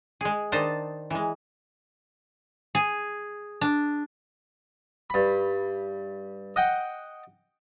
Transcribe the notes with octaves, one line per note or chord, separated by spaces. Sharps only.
G#3 G#4
D#3 D4 D#4 C5 A5
E3 G#3
G#4
D4
G2 B5
D#5 F#5 G5